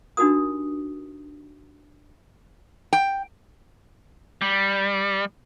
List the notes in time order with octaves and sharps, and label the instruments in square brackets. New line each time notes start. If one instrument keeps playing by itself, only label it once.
[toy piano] D4 D#4 F#4 G4 A#4 D#6
[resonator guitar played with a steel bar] G5
[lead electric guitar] G3